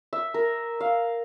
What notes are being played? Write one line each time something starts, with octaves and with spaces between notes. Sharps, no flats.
E5
A#4
F5